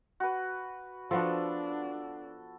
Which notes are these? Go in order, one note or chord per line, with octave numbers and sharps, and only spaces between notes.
F#4 B4
F3 B3 D4 F#4 A4